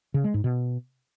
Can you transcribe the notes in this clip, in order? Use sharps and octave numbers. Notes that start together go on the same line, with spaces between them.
C#3
G#3
G#2
B2